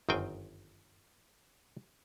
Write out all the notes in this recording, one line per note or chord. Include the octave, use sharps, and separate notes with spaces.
G1 F#2 D#3 C4 G5 G#5